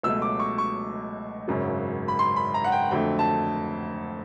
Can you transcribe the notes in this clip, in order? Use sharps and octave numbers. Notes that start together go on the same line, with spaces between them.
C#2 B2 F#3 A3 E6
D6
C#6
C#6
G#1 F#2 C#3 F#3
B5
C6
B5
A#5
F#5
G5
F2 D3 F#3 A3 G5
A5